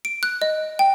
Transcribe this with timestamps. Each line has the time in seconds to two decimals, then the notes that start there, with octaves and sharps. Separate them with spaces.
0.05 D7
0.23 F#6
0.42 D#5
0.79 G5